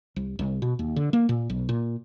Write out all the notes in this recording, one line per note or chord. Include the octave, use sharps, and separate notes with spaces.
C2
C2
B2
D#2
D3
A#3
A#2
B1
A#2